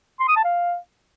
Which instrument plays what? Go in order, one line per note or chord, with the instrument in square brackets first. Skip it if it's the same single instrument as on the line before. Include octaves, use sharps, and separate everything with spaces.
[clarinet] C6
D#6
A5
F5